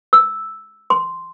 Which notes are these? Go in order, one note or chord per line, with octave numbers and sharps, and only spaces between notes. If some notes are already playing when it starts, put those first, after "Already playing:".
E6
C6